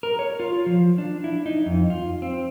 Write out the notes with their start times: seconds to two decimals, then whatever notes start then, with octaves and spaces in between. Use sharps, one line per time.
0.03 A#4
0.19 C#5
0.40 F4
0.66 F3
0.98 D4
1.24 E4
1.46 D#4
1.66 F2
1.90 F4
2.22 C4